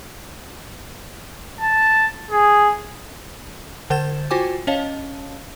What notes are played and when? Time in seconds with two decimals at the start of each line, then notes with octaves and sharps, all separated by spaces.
1.61 A5
2.31 G#4
3.90 D3 C5 G6 A6 E7
4.30 F4 F#4 C5 G5 G#5 D6
4.67 C#4 C#5 D#5 F5 A5